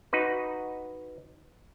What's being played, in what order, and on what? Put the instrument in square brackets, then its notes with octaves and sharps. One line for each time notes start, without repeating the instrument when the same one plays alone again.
[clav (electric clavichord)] D#4 F#4 B4